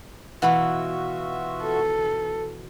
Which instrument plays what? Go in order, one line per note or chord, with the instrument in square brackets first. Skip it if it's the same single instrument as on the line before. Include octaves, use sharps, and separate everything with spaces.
[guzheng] B2 E3 [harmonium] F4 F#4 E5 [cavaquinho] F#5 B5 C#6
[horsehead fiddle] A4